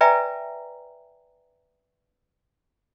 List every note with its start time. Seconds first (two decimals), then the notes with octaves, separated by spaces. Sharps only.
0.01 B4 D5 E5 G5 G#5 A#5